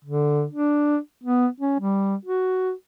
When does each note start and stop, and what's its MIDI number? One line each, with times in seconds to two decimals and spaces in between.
0.04 0.44 50
0.51 0.97 62
1.24 1.47 59
1.60 1.75 61
1.80 2.15 55
2.25 2.72 66